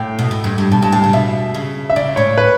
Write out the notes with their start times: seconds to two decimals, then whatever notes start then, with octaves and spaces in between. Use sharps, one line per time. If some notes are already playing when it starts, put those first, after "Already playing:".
Already playing: A2 G5
0.19 B2
0.31 A2
0.44 G2
0.58 G2
0.72 B2 A5
0.82 G2 A5
0.92 A2 A5
1.04 C#3
1.13 B2 E5
1.54 C#3
1.90 E5
1.96 C#3 D5
2.16 A2 C#5
2.38 B4